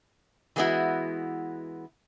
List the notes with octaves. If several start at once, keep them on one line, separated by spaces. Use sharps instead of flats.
E3 G#3 B3 C#4 E4 F#4